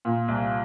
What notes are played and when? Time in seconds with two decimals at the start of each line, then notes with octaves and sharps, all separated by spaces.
0.05 A#2
0.28 C2